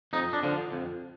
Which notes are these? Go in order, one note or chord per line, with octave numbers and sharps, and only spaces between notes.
F2 D#4
D4
D3 F3
F2